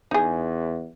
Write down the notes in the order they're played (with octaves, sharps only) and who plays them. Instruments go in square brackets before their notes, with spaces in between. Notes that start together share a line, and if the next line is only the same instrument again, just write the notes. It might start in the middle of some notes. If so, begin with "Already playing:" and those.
[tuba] E2 [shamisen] D#4 G#4